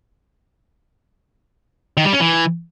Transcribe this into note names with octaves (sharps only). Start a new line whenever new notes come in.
D#3
G3
C#4
E3